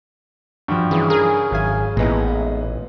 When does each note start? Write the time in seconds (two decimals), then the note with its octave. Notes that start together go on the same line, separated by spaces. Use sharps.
0.68 G2 F3 F#4 G5
0.91 C#3 E3
1.10 G#4 A#4
1.51 G#1 F#3 E5 F5 G#5
1.97 A1 A#2 G#3 B3 D#4 E4